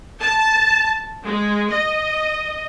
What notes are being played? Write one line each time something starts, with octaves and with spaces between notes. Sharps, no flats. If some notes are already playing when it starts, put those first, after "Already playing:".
A5
G#3
D#5